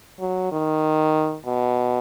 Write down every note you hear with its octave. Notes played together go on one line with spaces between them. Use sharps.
F#3
D#3
B2